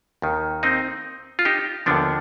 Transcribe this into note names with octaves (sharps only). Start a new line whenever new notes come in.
D#2 D#3
C4 D#4
F4
D#4 G4
D#2 D3 F3 B3 D4